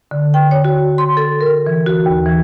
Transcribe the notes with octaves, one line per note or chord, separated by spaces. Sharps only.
D3
G5
C#5
F#4
C6
A4
A#4
E3
F#4
D#2
E3